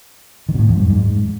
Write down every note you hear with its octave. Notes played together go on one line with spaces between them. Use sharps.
D#3
B2
A2
E2
G#2
F#2
G#2